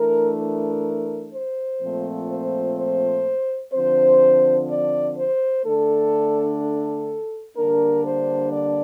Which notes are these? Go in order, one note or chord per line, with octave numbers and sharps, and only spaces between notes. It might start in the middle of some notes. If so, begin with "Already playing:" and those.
Already playing: E3 A3 D4 A#4
A#4
C5
A#2 F3 A3 C4
C5
C5
D3 F3 C4 C5
D5
C5
D3 A3 D4 A4
A4
D3 G3 A#3 D4 A#4
C5
D5